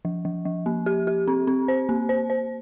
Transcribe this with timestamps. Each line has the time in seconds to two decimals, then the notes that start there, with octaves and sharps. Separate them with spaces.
0.05 F3
0.25 F3
0.45 F3
0.66 A#3
0.86 G4
1.07 G4
1.28 C4
1.47 C4
1.68 C5
1.89 A#3
2.09 C5
2.30 C5